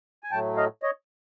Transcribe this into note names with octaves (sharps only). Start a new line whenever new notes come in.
G#5
A2 F#3 A3 G5 A5
D#5 F5
C#5 D#5